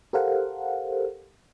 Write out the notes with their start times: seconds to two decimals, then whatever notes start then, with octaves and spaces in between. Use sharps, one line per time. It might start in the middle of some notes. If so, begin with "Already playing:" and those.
0.13 G4 A4 A#4 C5 F5 F#5